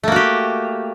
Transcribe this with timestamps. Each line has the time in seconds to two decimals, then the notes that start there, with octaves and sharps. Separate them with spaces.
0.03 A3
0.08 A#3
0.12 F#4
0.16 G4